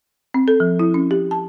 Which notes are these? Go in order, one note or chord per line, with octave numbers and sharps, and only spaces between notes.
C4
A4
F3
E4
C#4
G4
A5